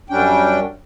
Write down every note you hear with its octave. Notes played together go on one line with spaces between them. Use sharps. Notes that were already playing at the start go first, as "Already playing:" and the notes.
F#2 G3 C#4 D4 G5